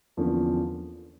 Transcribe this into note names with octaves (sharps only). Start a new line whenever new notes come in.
E2 D3 F3 A#3 C#4